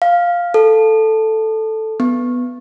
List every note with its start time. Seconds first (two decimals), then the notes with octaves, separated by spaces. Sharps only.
0.02 F5
0.54 A4
2.00 B3